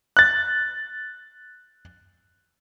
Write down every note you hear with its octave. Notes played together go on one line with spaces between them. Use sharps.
F#6 A6